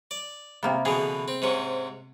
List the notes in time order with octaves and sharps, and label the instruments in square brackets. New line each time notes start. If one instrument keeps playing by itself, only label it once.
[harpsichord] D5
[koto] C3 A#3 B3
[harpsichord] B2 D3 E3 [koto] G#4
[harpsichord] C4
G#2 C3 C#4